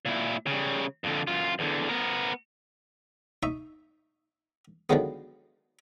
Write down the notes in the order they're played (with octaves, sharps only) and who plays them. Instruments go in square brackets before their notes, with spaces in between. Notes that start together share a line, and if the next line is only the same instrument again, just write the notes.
[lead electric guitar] A#2 E4
C#3 G3
F2 D3
F#2 F4
E2 D3
B3 A#4
[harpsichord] D#4 E5 C#6
D3 D#3 F3 F#3 G#3 B3